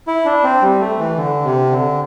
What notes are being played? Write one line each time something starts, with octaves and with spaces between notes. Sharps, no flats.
E4
D4
C4
G3
A3
E3
D3
C3
D3